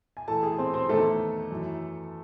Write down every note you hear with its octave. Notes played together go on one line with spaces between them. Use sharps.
G#5
A2 E3 A4 A5
G#4 G#5
C4 C5
C4 C5
E2 D#3 A3 A4
F#2 E3